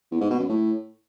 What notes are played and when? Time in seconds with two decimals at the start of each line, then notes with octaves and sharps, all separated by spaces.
0.11 E2
0.21 G#2
0.30 B2
0.40 F#2
0.49 A2